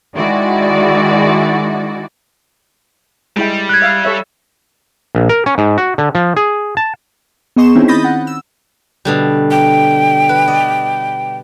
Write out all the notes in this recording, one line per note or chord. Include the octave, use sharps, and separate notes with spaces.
D#3 G#3 E4 F#4 D5
G3 G#3 E4 G5
F#6 G#6
E5 F5
A4 C#5 E5
A#1
A#4
C#4
G#2
F#4
D3
F3
G#4
A5
B3 G#4 D#5 C6 C#6 E7
D#3 C4 C#4 D#4 E4
B5 D#6 G6 A6 A#6
F#5
E6
B2 D3 G3
G5
B4
D5 D#5